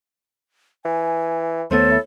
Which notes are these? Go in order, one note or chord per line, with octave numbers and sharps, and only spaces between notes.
E3 G#5
D#2 A3 B3 A4 C5 C#5
E4